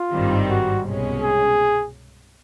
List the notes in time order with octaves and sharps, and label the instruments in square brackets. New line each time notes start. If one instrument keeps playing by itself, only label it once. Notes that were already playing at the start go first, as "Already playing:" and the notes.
Already playing: [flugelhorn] F4
[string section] G#1 G2 D#3 G3 C4
[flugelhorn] F#4
[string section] C2 B2 G#3 C#4
[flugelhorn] G#4